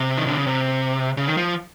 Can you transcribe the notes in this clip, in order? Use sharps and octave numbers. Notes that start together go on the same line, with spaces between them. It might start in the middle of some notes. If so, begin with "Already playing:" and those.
Already playing: C3
D#3
D3
C#3
C3
C#3
D#3
F3